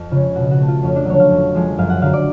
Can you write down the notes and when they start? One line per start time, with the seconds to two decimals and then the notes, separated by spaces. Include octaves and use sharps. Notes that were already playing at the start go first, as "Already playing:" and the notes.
Already playing: F2
0.12 C#3 G#3 F4
0.35 B2 F#4
0.51 F#4
0.60 A3
0.68 F4
0.83 F2 C#4
0.96 D4
1.05 D3 F#3 A3 C#5
1.20 F5
1.30 F2
1.55 F3 G#3
1.78 F#2 F5
1.90 F#5
2.02 D3 F#3 F5
2.13 D5